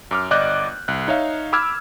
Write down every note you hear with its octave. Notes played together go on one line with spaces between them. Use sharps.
F#2 D6 F6
G1 D5 D#5 D6 F#6 G6
C2 F#6
D#4 C#5 E5 F5
B5 D6 E6 F6 G#6